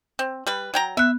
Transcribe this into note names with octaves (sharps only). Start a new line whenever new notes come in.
C4
G3 B4
F#3 G5 A#5
B3 E5 F#6